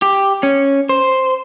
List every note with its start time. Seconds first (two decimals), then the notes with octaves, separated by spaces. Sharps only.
0.02 G4
0.43 C#4
0.89 C5